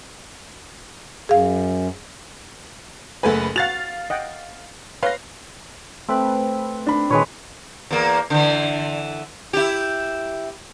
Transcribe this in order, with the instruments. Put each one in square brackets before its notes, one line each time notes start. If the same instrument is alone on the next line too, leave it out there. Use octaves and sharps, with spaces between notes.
[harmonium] F#2 [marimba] G#4 F5
[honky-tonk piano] F#1 A3 B4 [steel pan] E5 F#5 G#5
[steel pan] F#4 F#5 [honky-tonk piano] F5 A6 F7
[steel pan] D#5 F#5 G5
[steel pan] B4 C#5 C6 [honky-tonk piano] F5 A#6
[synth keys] A3 B4 [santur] C4
[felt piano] D4 B5
[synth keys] A#2 D#3 [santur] G#3 B4 C#5
[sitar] E2 A#3
D3 E3
E4 G4